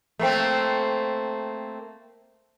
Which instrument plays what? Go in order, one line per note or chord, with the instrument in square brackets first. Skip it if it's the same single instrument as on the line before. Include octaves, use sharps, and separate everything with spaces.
[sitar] A3 A#3 C4